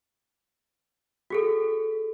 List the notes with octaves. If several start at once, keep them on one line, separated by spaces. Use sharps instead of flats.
F#4 G#4 A4